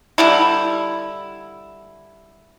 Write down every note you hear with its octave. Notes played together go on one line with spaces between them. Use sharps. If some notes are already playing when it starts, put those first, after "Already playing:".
D3 G3 E4